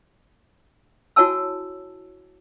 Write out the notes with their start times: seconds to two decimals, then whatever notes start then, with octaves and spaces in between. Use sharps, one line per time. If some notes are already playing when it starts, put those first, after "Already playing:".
1.16 E4 F#4 C#5 G#5 A5 E6